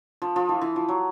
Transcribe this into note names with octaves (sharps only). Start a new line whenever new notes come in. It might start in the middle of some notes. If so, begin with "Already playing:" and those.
F3
F3
E3
E3
F3
F#3